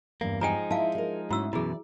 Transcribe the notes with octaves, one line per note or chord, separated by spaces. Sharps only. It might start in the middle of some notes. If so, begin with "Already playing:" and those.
E2 G2 A#3
F3 G#3 D#4 G5 G#5 A#5
E4 C5 E5 F5 A5
G#4 A#4
G#2 A3 C#4 E4 F#4 E6
F#2 B2 E3 E4 G#4 D5